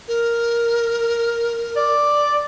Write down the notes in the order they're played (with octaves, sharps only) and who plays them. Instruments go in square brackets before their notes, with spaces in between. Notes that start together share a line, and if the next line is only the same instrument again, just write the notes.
[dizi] A#4
[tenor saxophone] D5